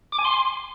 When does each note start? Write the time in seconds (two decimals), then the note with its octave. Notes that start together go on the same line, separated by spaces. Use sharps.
0.12 D6
0.19 G#5
0.25 C6